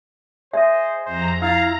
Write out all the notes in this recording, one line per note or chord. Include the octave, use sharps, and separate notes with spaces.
G#4 C5 D#5 E5
F2 C5 A#5
E4 F4 F5 A#5